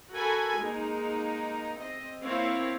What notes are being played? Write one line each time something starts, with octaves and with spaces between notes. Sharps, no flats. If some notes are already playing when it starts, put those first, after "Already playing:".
F#4 A4 A#4 G#5 B5
G#3 A#3 D#4
C4 D#5
A#3 C4 E4 C#5 F5